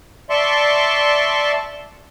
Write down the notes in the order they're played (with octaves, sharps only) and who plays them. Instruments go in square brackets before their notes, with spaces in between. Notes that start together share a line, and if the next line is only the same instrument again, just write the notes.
[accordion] D5 E5 A5 C6 C#6